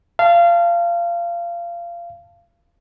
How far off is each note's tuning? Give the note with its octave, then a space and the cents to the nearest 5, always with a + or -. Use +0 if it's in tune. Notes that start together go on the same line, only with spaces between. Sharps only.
F5 -25 A5 +0